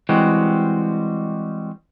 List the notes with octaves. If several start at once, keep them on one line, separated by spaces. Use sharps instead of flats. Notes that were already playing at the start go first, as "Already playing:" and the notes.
E3 G3 G#3 C4 F#4